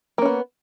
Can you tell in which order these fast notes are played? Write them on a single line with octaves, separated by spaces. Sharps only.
A#3 C#4 B3